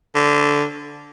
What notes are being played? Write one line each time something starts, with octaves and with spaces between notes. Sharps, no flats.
D3